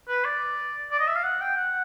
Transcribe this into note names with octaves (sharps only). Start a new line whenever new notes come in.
B4
D5
D5
D#5
E5
F5
F#5
G5
F#5